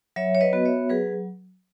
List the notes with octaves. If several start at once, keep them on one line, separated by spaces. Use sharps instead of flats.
F#3 C#5 E5
C#5
B4 D#5
B3 F#4
C#5 E5
F#3 G#4 B4